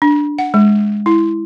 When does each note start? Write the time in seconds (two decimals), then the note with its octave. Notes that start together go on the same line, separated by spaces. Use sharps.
0.02 D4
0.39 F#5
0.54 G#3
1.06 E4